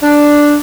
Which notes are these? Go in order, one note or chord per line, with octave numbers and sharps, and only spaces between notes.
D4